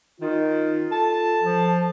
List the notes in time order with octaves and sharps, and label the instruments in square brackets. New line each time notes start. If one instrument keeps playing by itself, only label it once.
[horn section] D#3 [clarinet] F4
[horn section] A4 A5
[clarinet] F3